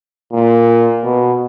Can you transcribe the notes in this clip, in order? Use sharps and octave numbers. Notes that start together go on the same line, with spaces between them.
A#2
B2